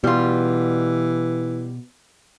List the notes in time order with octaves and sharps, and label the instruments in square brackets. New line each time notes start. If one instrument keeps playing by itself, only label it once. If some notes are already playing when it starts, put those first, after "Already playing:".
[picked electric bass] B2 [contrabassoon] E3 [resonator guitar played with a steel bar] G3 F4